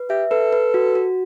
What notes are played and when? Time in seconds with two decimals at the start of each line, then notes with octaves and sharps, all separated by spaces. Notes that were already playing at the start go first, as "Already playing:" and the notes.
Already playing: B4
0.10 G4 E5
0.31 A4 B4
0.53 B4
0.74 F#4
0.95 F#4